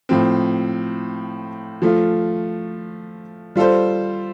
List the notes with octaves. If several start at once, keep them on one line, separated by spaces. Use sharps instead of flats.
A2 F3 C4
F3 A3 F4
G3 F4 A4 C5